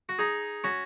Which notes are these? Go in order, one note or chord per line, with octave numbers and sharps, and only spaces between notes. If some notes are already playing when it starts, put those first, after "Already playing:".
F#4
D#4 G#4
C#4 F#4